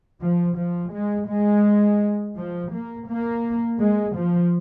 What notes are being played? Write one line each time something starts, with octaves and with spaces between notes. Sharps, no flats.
F3
F3
G#3
G#3
F3
A#3
A#3
G#3
F3